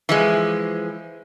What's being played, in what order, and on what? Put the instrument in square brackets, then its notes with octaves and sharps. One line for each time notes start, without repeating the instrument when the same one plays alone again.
[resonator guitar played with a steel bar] E3 F3 G#3